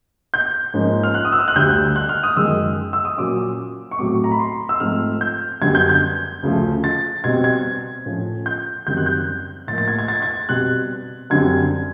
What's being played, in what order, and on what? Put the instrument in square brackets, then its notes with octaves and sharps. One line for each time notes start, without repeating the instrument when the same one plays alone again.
[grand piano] G6
G#2 F3 A#3 C#4
F6
F#6
D#6
E6
F6
F#6
D2 D3 G3 G6
F#6
F6
D#6
F#2 D#3 G#3 E6
E6
D#6
A#2 F#3 A#3 C#4 D6
C#6
A2 F#3 A3 C4 D6
A#5
B5
C6
E6
G#2 F3 A3 C4 F6
G6
F#2 D3 G3 B3 G#6
G6
G6
D2 C#3 F3 A3
A6
B2 G3 C4 G#6
G#6
A2 F3 A3 C#4
G6
F#2 D#3 G3 C4 G6
F#6
G6
A2 F3 A#3 A6
A6
G#6
G#6
A6
G#6
B2 G3 C4 F#6
F#2 D3 G3 C4 G#6